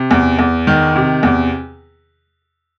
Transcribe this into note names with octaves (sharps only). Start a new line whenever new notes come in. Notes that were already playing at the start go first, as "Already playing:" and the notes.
Already playing: C3
E2
E2
D#3
C3
E2